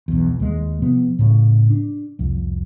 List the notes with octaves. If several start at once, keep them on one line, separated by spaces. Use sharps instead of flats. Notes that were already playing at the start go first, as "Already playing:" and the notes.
B1 E2
D#2 G#3
C3 F3 B3
A2 C#3
D4
C2 F2